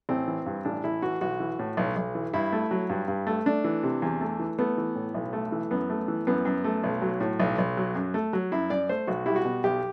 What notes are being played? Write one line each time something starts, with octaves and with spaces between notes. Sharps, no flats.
A1 C4
E3
G2
A1 D4
A1 E4
E3 F#4
B1 F#4
E3
A2
B1
B1
E3
G2 E4
A3
F#3
G2
G2
A3
A3 D4
E3
C3
E2
A3
E3
A3 B3
E3
A2
B1
A3
E3
F#2 B3
A3
E3
F#2 B3
F#2
A3
B1
F#3
A2
B1
B1
F#3
F#2
A3
F#3
F#2 E4
F#2 D5
A3 C5
B1 F#4
G3 E4
F#4
B2
B1 G4